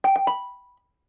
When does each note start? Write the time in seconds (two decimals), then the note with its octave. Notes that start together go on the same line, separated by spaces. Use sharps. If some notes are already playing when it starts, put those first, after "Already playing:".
0.04 G5
0.16 G5
0.27 B5